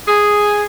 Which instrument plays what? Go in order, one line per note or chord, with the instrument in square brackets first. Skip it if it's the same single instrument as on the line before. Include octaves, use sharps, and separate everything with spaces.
[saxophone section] G#4